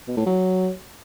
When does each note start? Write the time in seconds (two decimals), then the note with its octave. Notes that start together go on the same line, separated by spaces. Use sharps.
0.08 B2
0.17 A2
0.26 F#3